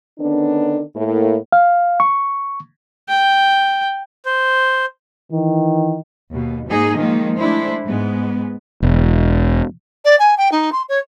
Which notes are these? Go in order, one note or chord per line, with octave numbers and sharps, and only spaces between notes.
D3 D#3 B3 C#4 D4
A2 A#3
F5
C#6
G5
C5
D#3 E3
D#2 B2
G#2 A#3 D#4 G#4 D#5
D#3 F3 G#3 A#3
G#3 A3 D4 E4 C5
G#2 G#3 B3
E1
D5
G#5
G5
D#4
C6
C#5